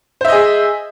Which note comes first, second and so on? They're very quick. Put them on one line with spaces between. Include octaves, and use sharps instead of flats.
C5 E5 D#5 G#4